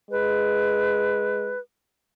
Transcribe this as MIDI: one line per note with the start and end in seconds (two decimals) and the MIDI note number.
0.11 1.54 56
0.11 1.59 71